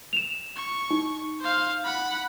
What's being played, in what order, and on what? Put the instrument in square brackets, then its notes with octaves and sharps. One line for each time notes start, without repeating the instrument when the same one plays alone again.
[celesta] E7 F7
[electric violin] C#6
[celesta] D#4
[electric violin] C5 F5
F#5 B5